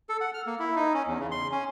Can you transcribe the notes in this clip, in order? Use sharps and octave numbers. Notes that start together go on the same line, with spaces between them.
A4
F#5
F6
A#3
E4
D#4
C#4
E2
C#3
C6
C#4